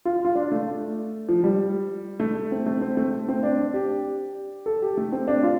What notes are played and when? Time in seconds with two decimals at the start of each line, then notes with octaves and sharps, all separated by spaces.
0.05 F4
0.25 F4
0.36 D4
0.52 A3
1.28 F3
1.44 G3
2.20 A3
2.52 C4
2.66 A3
2.81 C4
2.97 A3
3.28 C4
3.43 D4
3.74 G4
4.66 A4
4.82 G4
4.97 A3
5.12 C4
5.28 D4
5.43 F4